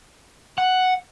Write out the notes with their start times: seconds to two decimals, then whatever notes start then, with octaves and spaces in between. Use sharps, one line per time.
0.58 F#5